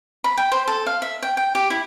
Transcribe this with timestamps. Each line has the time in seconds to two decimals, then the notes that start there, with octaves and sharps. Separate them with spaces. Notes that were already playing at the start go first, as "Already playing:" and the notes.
0.24 B5
0.37 G5
0.52 C5
0.68 A4
0.86 F5
1.02 E5
1.23 G5
1.37 G5
1.55 G4
1.70 E4